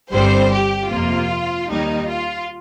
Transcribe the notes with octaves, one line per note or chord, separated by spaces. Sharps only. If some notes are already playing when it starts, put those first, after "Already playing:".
G1 G2 G3 C4 C5
G4
F2 C3 F3 A#3 F4
D#2 D#3 G3 A#3 D#4
F4